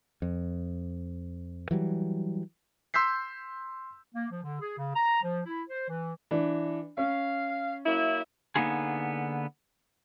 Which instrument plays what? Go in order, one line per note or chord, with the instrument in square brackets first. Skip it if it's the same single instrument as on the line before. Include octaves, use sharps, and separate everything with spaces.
[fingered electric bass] F2
E3 F#3 G3
[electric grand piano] C6 E6 G6 B6 C7
[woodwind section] A#3
F3
D3
G#4
C#3
A#5
F3
E4
C5
E3
[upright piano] E3 D4
[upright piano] C#4 [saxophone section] F5
[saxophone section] F#3 A#3 E4
[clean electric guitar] D3 A#3 B3 D#4 F4 G#4